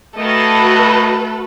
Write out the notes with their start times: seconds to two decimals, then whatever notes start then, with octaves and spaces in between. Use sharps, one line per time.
0.17 D#2 D#3 A3 F#4 A4 B4 D#5